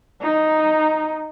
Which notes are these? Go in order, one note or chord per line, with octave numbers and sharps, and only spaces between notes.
D#4